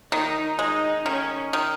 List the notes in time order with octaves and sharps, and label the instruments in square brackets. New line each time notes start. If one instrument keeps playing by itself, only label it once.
[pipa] D#3 [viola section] D#4
[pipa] G#3 [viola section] D#4
[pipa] D#3 [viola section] C#4
[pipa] D#3